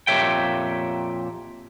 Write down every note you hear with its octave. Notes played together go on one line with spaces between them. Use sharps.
F2 A#2 G4 C#5 E5 G5